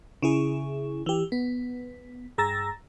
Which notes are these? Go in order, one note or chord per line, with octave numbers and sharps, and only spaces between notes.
C#3 E4 G#4
E3 G4
B3
G2 G#4 A#5 E6 A6 A#6